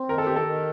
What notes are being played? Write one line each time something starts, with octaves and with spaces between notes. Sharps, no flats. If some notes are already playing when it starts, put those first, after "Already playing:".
Already playing: C4
D#3 A#4
A4
D#3 G4
A4
D#3